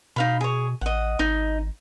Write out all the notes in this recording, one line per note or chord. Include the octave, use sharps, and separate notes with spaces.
B2 D#4 F5 B5
G#4 C#5
A1 D#5 F#5
G#1 D#4